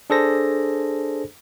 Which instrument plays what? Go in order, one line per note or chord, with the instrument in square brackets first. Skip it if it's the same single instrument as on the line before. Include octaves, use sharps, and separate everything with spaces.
[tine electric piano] D4 G#4 A4 C5 A#6